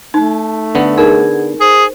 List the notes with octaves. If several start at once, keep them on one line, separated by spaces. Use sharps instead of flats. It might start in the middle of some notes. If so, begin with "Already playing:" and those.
A3 D#4 A5
D3 B3
D#4 G#4 A#4
G#4 C5